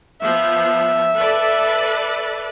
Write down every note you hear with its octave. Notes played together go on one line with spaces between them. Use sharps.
F3 B3 E5
A4 B4 D5